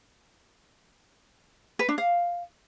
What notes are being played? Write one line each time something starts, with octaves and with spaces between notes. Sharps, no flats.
B4
D4
F5